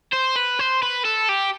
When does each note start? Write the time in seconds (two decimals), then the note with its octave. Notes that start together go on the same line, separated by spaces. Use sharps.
0.13 C5
0.36 B4
0.59 C5
0.82 B4
1.05 A4
1.29 G4